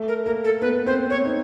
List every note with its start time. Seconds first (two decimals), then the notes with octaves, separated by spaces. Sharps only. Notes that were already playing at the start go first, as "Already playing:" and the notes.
Already playing: A3
0.08 A#4
0.26 A#3 A#4
0.44 A4
0.61 B3 B4
0.86 C4 C5
1.10 C4 C#5
1.25 D#4